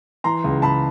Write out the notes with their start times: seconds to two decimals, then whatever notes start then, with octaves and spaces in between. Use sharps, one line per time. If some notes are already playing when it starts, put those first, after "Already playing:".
0.24 E3 A#5 C6
0.44 C#2
0.62 C#2 A5 B5